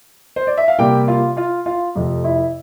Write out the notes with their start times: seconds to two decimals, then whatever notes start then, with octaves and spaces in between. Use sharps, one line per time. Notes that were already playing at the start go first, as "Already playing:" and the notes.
0.36 C5
0.47 D5
0.57 E5
0.68 F5
0.79 C3 G3 A#3 G4 G5
1.08 F4 F5
1.37 F4 F5
1.66 F4 F5
1.95 F2 C3 F3 A3
2.24 E4 E5